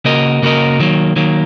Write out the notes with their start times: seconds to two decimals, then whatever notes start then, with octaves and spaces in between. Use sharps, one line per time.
0.05 C#3 A#3 F#4 A#4 D#5
0.42 C#3 A#3 F#4 A#4 D#5
0.80 D#3 F#3 A#3
1.16 D#3 F#3 A#3